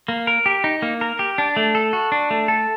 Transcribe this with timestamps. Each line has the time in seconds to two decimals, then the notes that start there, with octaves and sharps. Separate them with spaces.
0.08 A#3
0.27 A#4
0.46 G4
0.64 D#4
0.82 A#3
1.01 A#4
1.19 G4
1.38 D4
1.56 A3
1.75 A4
1.93 F#4
2.12 D4
2.30 A3
2.48 A4